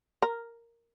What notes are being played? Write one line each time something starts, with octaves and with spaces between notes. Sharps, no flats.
A#4